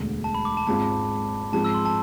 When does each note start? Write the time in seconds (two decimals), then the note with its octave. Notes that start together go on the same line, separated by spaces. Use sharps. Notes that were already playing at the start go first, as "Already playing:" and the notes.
Already playing: E1 D2 D3 G#3
0.24 A5
0.34 B5
0.45 D6
0.57 A5
0.67 G#1 G#2 G#3 C4 F4 A5
1.53 G#2 F3 G#3 C4 A5
1.65 E6
1.74 C6
1.85 A5